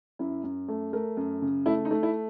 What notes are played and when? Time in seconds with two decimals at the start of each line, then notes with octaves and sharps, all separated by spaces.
0.19 F#2 E4
0.44 F#2
0.68 A3
0.93 A3 A#4
1.17 F#2
1.42 C#3
1.66 A3 E4
1.85 D#4
1.91 A3
2.03 E4